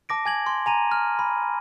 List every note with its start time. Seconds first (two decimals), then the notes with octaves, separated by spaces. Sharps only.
0.09 A5 D6 A#6 D7
0.25 G#5 G#6 F#7
0.46 C6
0.66 G#5 A#5 D#7
0.91 F6
1.19 B5